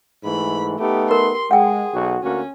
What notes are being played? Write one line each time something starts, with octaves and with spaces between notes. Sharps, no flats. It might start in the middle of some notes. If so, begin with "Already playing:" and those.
G#2 E3 A3 B5
A3 B3 D#4 G4
A#4 C6
G#3 G#4 F#5 G5
B1 F#4
D2 A#3 C#4 F#4